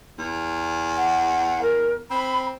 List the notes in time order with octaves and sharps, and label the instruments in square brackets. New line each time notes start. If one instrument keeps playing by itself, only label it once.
[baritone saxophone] E2
[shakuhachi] F#5
A#4
[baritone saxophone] C4 [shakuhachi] B5